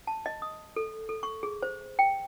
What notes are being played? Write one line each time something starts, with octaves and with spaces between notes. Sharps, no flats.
A5
D#5
D#6
A4
A4
C#6
G#4
C5
G5